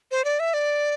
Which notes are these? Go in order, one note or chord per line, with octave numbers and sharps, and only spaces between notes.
C5
D5
E5
D5